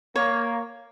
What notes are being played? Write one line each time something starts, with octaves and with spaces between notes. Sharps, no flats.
A#3 C#5